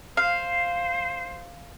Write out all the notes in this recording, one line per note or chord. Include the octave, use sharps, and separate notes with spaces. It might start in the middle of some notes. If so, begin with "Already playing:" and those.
C5 F5